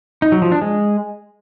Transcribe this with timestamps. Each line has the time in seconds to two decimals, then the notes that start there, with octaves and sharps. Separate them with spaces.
0.22 D#4
0.32 F#3
0.42 F3
0.52 D4
0.62 G#3